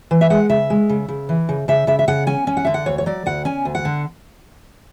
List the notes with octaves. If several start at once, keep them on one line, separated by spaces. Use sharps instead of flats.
E3
E5
G#3 F#5
C#3 E5
G#3
C#3
C#3
E3
C#3
C#3 E5
C#3 E5
E5
C#3 F#5
C#4 G#5
C#4
F#5
D3 E5
F#5
D2 C#5
C#5
F#3 D5
D2 F#5
C#4 G#5
D2
F#5
D3